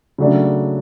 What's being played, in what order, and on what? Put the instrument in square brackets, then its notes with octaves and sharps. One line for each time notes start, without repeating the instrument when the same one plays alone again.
[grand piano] C#3 F#3 A3 D4